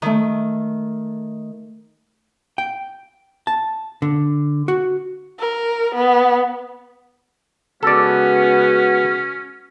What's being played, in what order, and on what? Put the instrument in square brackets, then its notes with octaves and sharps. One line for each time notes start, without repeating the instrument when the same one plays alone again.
[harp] D#3 A3
[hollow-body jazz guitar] G5
A5
D3
F#4
[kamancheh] A#4
B3
[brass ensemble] C#3 G#3 B3 [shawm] C#4 [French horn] F#4 [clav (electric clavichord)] A4 D5